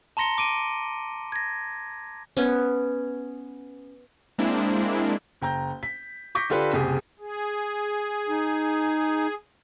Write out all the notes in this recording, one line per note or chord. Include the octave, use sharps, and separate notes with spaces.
A5 A#5 C6 A#6 C#7 G7
D6 D7 D#7
G#6 A#6
B3 C#4
G#3 A#3 C4 D4 E4
F#1 G5 A#5 G6
B6
C#6 D6 G6 A#6 B6
D3 D4 F4 G4 A4 B4
F#1 C2 G4 G#4
G#4
D#4